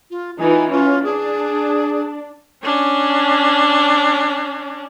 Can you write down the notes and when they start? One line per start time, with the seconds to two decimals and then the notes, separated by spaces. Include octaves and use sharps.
0.11 F4
0.39 E3 D#4 F4 G#5
0.71 C#4 F4
1.04 D4 G#4
2.63 C#4 D4